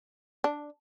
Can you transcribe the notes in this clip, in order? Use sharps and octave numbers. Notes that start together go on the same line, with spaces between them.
D4